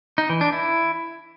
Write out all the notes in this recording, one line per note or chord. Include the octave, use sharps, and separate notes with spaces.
D#4
E3
D4
E4